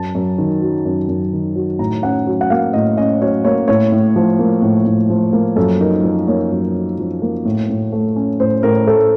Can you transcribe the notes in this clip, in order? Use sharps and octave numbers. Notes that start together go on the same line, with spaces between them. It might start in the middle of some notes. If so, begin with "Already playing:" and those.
Already playing: F#2 A5
F#2
D#3
F#3
F#2
F#2
D#3
F#3
A2 A#5
C#4 F#5
F#3
F#5
A#3 F5
A2 D#5
C#4 D#5
F#3 C#5
A#3 C#5
A2 C#5
A2
F3
A#3
A2
A2
F3
A#3
F#2 A4
D#4 A#4
F3
A#3 C#5
F#2
D#4
F3
A#3
A2
A2
A3
C#4
A2 C5
A2 A#4
A3 A4